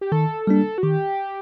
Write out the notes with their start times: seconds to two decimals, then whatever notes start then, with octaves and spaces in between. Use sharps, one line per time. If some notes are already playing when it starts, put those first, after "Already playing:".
0.01 G4
0.12 D#3 A4
0.47 G3 A#3 D4
0.78 F#4
0.83 D#3 G4